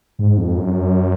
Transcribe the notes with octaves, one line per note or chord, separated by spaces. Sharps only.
G#2
F2
F#2